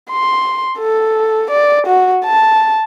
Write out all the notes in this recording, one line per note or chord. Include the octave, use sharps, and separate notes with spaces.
C6
A4
D5
F#4
A5